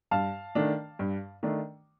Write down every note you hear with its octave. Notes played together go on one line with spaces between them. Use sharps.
G2 F5 A5
D#3 A3 D4
G2
D#3 A3 D4